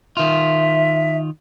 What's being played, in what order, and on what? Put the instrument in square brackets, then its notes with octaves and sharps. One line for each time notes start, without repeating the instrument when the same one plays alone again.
[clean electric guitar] D#3 F4 [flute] E5